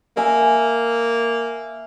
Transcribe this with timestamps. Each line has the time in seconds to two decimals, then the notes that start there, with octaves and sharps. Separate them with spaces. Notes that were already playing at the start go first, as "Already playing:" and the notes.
0.17 A#3 E5 G#5